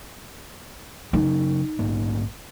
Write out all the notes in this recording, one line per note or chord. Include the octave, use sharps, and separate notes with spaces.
C#3 F#3 D#4
A#1 G#2 A#3